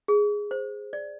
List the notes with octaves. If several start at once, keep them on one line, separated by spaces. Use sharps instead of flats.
G#4
C5
D5